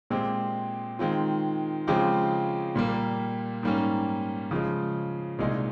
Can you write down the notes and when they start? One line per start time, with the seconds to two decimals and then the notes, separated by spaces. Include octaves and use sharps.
0.10 A#2 G#3 C4 G4
0.99 D#3 G#3 C4 F4
1.87 C#3 F3 G#3 C4 G4
2.75 A#2 G3 A#3
3.63 G#2 G3 A#3 C#4
4.51 C#3 F3 G#3
5.39 C2 A#2 G#3 D#4 G#4